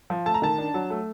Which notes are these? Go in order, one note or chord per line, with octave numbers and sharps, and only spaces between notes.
F3
A3 A5
A#5
D#3 A5
D4
F#3
A3